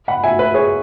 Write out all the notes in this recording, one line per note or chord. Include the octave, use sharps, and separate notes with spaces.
F#5 B5
E5 G#5
B4 E5
G#4 C#5